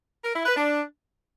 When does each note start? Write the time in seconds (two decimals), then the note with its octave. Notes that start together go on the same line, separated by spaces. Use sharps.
0.24 A#4
0.34 E4
0.45 B4
0.56 D4